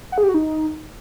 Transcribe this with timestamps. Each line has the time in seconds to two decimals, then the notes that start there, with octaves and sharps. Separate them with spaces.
0.12 F#5
0.18 G#4
0.23 G4
0.29 F#4
0.34 D#4